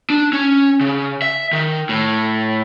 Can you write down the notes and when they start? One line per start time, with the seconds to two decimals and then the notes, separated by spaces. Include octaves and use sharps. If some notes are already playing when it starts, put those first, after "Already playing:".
0.10 D4
0.33 C#4
0.81 C#3
1.22 E5
1.53 D#3
1.89 A2